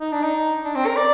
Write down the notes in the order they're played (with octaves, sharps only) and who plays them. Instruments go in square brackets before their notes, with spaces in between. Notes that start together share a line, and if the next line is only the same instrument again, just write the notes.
[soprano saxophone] D#4
D4
D#4
D4
C4
A#4
D5